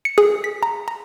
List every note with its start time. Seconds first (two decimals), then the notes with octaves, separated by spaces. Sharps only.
0.05 C#7
0.18 G#4
0.44 B6
0.63 A#5
0.88 A#5